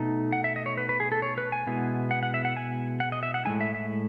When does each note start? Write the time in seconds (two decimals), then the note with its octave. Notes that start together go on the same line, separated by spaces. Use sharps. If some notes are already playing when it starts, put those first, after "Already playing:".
Already playing: B2 A3 D#4
0.32 F#5
0.44 E5
0.56 D#5
0.66 C#5
0.77 B4
0.89 B4
1.00 G#4
1.12 A4
1.22 C#5
1.38 B4
1.52 G#5
1.67 B2 G#3 B3 E4
2.11 F#5
2.23 F#5
2.34 E5
2.45 F#5
2.57 G#5
3.00 F#5
3.12 D#5
3.23 E5
3.34 F#5
3.45 A2 G#3 D#4 G#5
3.61 E5
3.74 E5